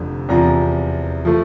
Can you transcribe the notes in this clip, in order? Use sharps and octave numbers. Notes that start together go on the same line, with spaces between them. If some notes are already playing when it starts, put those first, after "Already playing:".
Already playing: F1 F2 D3
E2 C3 F3 A#5
F3 A3